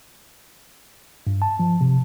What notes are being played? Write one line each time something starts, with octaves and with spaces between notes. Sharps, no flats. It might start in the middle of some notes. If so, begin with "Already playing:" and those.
G2
A5
F3
C3